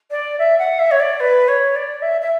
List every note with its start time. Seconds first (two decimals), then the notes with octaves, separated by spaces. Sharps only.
0.11 D5
0.39 E5
0.58 F#5
0.79 E5
0.91 C#5
1.00 D5
1.20 B4
1.48 C#5
1.75 D5
2.02 E5
2.21 E5